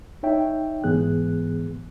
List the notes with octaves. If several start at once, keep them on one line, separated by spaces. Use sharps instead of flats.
D#4 C#5 E5 G5
G#2 E3 B3 G#4 F#6